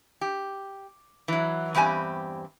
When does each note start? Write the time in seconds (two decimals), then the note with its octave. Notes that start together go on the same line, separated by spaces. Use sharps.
0.21 G4
1.28 E3 F#3
1.75 E2 G2 C4 G4 G#5